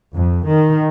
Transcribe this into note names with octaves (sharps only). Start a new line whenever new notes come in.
F2
D#3